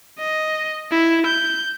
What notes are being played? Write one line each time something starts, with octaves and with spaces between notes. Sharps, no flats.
D#5
E4
G6